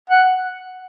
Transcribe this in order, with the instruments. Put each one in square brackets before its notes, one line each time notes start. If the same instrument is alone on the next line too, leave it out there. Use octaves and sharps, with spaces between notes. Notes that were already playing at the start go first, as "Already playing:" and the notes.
[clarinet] F#5